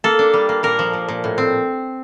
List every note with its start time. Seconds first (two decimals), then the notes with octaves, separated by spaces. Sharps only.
0.04 A#3 A4
0.19 D4
0.34 G3
0.49 A#3
0.63 A#2 A#4
0.79 F3
0.93 A#2
1.08 A#2
1.24 A2
1.38 C4